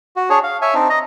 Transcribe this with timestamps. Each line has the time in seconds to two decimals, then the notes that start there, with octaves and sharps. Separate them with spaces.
0.16 F#4
0.30 D4 G#4 C#5
0.44 F5
0.62 C#5 E5 G#5
0.74 C4 D4 D#4
0.90 D#5 A#5